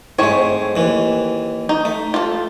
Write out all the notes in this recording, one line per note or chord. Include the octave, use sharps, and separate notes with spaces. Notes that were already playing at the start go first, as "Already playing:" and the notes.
G#2 A3 C4 C#5
D#2 E3
D#4
A3
F4 A4